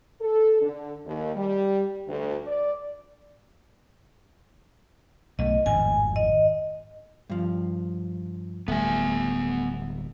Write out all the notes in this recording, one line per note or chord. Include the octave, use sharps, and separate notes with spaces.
A4
D3
D#2
G3
D2
D5
B1 A3 D#5
G#1 F2 A2 G#5
D#5
G2 F3
D1 G3 A3 B3 G#5